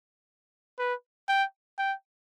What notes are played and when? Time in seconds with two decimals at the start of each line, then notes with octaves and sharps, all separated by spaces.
0.79 B4
1.29 G5
1.79 G5